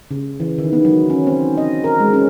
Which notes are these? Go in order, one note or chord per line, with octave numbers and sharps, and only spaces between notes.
C#3
E3
D#3
B3
F#3
C#4
C4
D#5
A#4
G#3
C#4